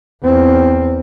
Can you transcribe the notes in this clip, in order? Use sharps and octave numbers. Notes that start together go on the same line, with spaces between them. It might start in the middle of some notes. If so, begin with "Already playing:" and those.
E2 C4